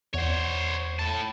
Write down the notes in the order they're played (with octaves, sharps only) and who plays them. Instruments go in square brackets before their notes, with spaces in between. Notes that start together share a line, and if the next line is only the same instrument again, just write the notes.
[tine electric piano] E2 F#5 [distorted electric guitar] C5 C#5
[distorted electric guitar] A2 A5